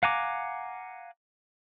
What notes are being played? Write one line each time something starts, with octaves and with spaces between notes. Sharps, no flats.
F5 F#5 G#5 A#5 D6